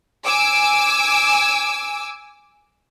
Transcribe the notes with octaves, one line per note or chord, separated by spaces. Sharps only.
G#5 D6 E6